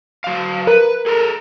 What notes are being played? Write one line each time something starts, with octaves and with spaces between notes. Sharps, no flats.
F#3 F5
A#4 B4
G#4 A4 A#5